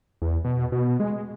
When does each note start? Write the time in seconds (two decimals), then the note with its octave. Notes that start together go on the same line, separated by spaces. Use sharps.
0.22 E2
0.45 B2
0.72 B2
1.00 G#3